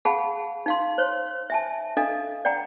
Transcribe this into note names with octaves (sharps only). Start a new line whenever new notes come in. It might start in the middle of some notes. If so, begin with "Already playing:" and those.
G#4 F5 F#5 A5 B5
D#4 F5 C6
C5 C#5
E5 G#5 A5
D4 A4 D#5 F5
D5 F#5 G5 A#5